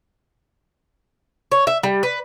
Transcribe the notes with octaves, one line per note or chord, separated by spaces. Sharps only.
C#5
E5
G3
B4